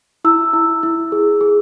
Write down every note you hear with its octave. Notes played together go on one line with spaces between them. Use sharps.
E4 E6
E4
E4
G#4
G#4